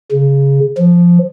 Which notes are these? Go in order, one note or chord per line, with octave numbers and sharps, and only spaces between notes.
C#3
F3